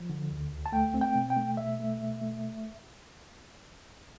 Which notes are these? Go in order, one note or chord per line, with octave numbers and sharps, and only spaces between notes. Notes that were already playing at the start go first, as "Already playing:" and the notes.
Already playing: F3
D3
D2
D2
A5
A3 G5
C4
G5
B2
G5
A3
B2 E5
A3
B2
A3